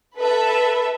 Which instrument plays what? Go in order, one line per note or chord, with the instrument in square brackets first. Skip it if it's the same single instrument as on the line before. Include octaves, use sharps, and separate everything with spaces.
[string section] A4 B4 E5